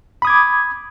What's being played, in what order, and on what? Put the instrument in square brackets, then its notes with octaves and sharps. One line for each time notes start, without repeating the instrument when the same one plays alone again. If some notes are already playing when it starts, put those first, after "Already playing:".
[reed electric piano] B5
D#6
G#6
D6